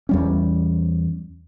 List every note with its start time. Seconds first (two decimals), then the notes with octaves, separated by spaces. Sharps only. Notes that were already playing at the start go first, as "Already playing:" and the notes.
0.09 E2 G3 C#4